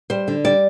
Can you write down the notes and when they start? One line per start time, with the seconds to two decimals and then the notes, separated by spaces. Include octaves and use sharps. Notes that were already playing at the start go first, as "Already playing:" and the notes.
0.10 G3 C5
0.28 D3
0.44 G3 D5